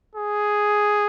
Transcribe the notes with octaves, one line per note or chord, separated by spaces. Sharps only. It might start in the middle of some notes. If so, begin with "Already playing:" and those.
G#4